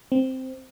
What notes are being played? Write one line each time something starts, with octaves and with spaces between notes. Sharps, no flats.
C4